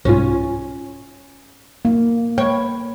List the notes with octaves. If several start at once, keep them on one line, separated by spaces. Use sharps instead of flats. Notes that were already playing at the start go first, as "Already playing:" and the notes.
C2 G#2 C#4 F4
A#3
B4 C#5 G5